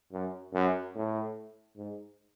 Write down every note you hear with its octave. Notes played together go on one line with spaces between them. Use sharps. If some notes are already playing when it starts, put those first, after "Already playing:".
F#2
F#2
A2
G#2